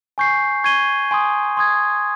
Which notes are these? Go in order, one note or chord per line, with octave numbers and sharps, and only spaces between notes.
G#5 C#6 G6 C7
C#6 G#6 D#7 G7
G#5 C6 D#6
C6 D#6 G#6